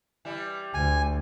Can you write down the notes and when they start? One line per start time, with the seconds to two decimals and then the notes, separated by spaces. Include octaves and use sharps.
0.25 E3 G3 E4
0.74 D2 G#5